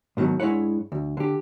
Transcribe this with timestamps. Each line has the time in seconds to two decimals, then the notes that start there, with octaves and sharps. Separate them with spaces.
0.17 G#2 B2 D#3 F#3
0.40 G2 G#3 E4 C#5 F#5
0.92 D2
1.17 D3 G4